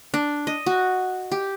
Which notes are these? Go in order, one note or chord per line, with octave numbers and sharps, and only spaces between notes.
D4
D#5
F#4
G4